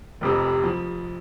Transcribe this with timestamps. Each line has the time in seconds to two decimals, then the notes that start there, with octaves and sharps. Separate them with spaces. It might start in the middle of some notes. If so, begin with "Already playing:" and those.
0.21 F1 F2 C3
0.64 F3